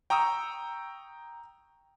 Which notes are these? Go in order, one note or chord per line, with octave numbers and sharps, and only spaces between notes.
G5 A#5 C#6 D#6 E6